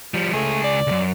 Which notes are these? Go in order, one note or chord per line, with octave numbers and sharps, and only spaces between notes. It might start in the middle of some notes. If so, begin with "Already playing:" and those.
F3 G3
C#2 A3 G#4
D5
C#2 F#2